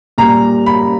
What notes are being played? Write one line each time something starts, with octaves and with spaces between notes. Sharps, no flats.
A#2 G3 A#5
B5